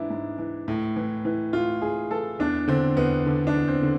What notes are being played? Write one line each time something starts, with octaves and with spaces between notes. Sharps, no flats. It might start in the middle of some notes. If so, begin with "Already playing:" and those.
Already playing: G#2 E3 D4 E4
G#2
E3
A2
E3
E3
A2 F4
A2 G#4
E3 A4
E2 D4
D3 C4
E2 B3
D3
D4
E2
C4
D3